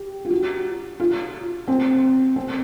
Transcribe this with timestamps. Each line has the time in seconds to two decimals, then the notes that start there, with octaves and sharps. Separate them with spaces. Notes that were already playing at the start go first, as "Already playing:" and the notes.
Already playing: G4
0.25 F4
0.31 F#4
1.00 F4
1.68 C4
2.36 C4